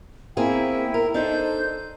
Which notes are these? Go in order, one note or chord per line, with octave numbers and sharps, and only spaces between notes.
A#3 C4 E4 G#4 G5
A#4
D4 D#4 A4 C5 G6